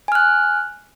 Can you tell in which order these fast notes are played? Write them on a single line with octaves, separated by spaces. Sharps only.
G#5 F6 F#6